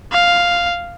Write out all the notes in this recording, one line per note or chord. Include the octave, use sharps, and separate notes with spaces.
F5